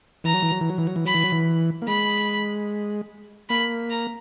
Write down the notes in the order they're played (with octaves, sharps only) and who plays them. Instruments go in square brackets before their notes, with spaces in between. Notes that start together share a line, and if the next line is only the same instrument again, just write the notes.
[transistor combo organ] E3 [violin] A#5
[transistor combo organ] F#3
E3
F#3
E3
F#3
E3
F#3
E3
[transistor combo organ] F#3 [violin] B5
[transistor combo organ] E3
F#3
E3
A#3
[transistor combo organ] G#3 [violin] B5
[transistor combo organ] A#3 [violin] B5
[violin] A#5